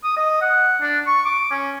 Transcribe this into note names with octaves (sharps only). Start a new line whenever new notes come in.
D#6
D#5
F#5
D4
C#6
D6
C#4